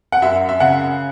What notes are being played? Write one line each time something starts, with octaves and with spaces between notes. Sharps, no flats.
F#5
F#2 E5
E5
C#3 F#5